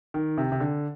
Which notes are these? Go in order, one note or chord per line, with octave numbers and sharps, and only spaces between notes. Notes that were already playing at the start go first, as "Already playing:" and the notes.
D#3
C3
C3
D3